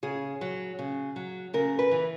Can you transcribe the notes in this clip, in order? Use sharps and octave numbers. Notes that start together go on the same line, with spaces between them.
C#3 G#4
F#3
C#3
F#3
C#3 A#4
B4
E3